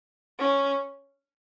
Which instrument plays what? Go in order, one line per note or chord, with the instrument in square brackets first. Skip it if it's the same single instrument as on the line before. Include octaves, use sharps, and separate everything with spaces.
[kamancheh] C#4